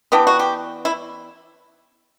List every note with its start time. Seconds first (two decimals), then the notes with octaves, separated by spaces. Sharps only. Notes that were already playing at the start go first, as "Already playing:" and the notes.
0.12 E3 B3 D4 G4
0.27 F#4
0.39 G4
0.85 E4